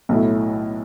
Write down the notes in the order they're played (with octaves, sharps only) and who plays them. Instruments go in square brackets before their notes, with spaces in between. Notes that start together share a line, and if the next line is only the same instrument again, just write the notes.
[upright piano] B1 A2 F#3 A3 E4